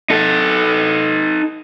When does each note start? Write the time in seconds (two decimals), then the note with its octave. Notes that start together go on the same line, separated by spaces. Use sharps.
0.10 D#4 A4